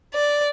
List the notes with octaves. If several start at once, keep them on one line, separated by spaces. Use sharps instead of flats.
D5